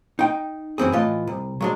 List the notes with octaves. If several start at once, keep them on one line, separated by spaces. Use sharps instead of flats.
D#4 G5
F#2 E3 C4 G#4
A2 E3 F4 D#5
C2
F#3 G#3 D4